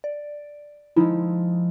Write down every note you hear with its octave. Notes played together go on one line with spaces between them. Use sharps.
D5
F3 G#3 D#4 E4